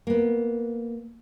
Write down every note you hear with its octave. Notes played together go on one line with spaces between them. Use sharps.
A#3 B3